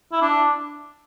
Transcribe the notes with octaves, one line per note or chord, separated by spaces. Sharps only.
E4
D4